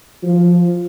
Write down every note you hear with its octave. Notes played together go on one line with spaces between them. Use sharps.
F3